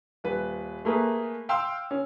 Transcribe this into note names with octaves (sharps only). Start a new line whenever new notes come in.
D#1 B4
A3 A#3 G#4 B4
F5 G5 C6 E6
C#4